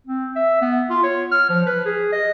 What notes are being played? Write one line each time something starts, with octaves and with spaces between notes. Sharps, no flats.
C4
E5
B3
F4
C#5
F6
F3
B4
G#4
D#5